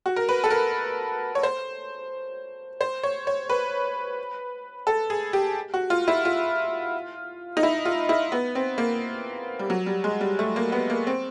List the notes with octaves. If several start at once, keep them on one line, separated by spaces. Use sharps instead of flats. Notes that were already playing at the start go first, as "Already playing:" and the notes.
F#4
A#4
B4
A4
A#4
C#5
C5
C5
C#5
C#5
B4
A4
G#4
G4
F#4
F4
E4
F4
D#4
E4
F4
E4
B3
C4
A#3
G3
F#3
G3
G#3
G3
A3
A#3
B3
A#3
C4